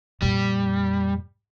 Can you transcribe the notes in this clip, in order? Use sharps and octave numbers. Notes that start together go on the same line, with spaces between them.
F2 A#2 G3